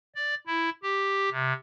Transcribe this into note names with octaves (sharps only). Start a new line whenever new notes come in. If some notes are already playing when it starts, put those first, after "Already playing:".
D5
E4
G4
C3